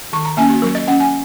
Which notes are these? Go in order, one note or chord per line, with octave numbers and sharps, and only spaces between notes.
D#3 C#6
A#5
A#3 C#4 G#5
F#4
F#3 A#4
D#5
C#4 F#5
G#5